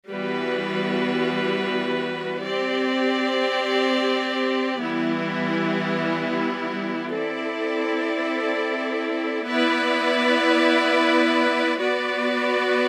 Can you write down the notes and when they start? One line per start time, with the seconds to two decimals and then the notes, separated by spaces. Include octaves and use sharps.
0.11 E3 G3 B3 F#4 B4
2.45 C4 G4 D5
4.79 E3 G3 B3 E4
7.12 C4 E4 A4 D5
9.46 B3 E4 B4 D5
11.80 B3 F#4 B4 D5